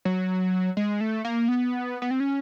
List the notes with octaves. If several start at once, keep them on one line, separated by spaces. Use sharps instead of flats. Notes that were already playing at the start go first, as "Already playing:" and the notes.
F#3
G#3
A3
A#3
B3
B3
C4
C#4